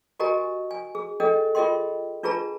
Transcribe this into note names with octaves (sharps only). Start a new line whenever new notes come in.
F#4 G4 A#4 D#5 G#5 A#5
G#5
G#4
D4 G#4 A4 D#5 G5
F4 G#4 A#4 D#5 G5 C6
D4 F4 G#4 B4 A5 A#5